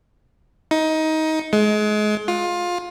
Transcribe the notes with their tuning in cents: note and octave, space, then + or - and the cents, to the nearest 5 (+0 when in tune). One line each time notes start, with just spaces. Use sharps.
D#4 +20
G#3 +30
F4 +20